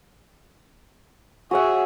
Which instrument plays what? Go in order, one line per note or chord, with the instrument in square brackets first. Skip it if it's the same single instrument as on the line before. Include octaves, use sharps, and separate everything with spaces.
[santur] F#4 C#5 F#5 [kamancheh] G#4 E5